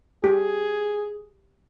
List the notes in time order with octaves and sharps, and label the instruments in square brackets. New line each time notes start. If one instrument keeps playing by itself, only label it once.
[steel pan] G4 [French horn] G#4